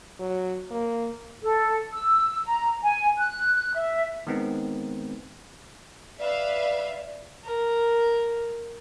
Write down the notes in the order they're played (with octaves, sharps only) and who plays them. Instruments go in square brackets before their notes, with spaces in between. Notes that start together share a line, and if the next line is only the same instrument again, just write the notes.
[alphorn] F#3
A#3
[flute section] A4
E6
A#5
G#5
F#6
E5
[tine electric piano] D#3 G#3 B3 C4 D#4
[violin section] B4 E5 F5 [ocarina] D5
[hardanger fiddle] A#4